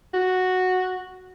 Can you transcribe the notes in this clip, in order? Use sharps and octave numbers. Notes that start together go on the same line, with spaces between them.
F#4